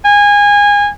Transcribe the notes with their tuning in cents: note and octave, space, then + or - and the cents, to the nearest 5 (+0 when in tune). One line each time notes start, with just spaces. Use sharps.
G#5 -25